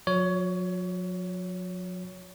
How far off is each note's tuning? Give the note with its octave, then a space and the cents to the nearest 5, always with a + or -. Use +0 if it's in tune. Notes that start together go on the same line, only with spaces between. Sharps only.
F#3 -45 C#5 +20